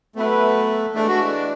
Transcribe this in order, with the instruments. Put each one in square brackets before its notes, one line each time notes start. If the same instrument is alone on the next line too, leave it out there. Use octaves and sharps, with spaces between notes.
[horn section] F#3 B3 E4 B4 [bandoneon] A3
[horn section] E3 G#3 D4 [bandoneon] A3
[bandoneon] F#4